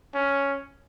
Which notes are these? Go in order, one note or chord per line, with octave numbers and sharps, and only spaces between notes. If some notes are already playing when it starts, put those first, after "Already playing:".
C#4